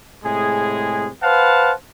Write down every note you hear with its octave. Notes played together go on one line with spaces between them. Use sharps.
A2 C3 G#3 G#4
B4 C5 F5 F#5 A5